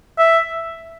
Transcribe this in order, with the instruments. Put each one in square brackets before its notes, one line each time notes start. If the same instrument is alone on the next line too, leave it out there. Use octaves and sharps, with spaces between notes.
[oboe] E5